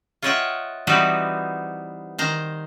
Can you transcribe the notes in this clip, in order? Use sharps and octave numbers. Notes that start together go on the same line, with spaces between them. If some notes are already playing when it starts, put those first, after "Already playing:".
F4 C#5 D#5 E5 F#5 G5
E3 G3 B3 C4 D#4 F#4
D#3 C5 A#5